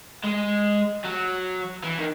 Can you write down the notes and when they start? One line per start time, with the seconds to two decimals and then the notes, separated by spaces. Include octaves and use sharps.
0.24 G#3
1.04 F#3
1.83 E3
1.99 D#3